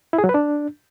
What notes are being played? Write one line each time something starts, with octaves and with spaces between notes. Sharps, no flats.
E4
G#4
F#3
B4
D4